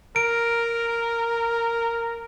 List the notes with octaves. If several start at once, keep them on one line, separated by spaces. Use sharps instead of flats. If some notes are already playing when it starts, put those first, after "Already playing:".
A#4 D7